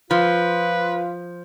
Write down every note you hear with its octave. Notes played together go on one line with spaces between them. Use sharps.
F3 F4 B4